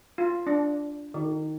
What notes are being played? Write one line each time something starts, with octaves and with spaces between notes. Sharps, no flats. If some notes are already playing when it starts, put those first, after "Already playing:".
F4
D4
D#3